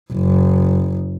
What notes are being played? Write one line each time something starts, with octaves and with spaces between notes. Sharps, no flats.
F#1